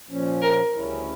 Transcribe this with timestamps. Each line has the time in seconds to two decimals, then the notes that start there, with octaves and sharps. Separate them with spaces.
0.09 A#2 F3 C#4
0.42 A#4
0.75 D2 C#3 G3 C#4 E4